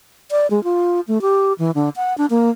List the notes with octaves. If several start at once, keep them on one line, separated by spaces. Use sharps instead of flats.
D5
G#3
F4
A3
G4
E3
D3
F#5
D4
A#3